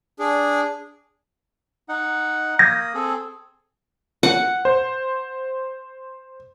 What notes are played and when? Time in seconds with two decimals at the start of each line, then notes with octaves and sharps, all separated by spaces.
0.19 D4 G#4
1.89 D#4 F#5
2.59 A#3 D#6 G6 G#6 A#6
2.94 C4 G#4 A4
4.23 F#5
4.65 C5